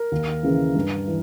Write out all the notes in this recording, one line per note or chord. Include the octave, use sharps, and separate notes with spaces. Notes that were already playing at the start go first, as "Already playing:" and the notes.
Already playing: A#4
D#2
C#3 E3
G2
E3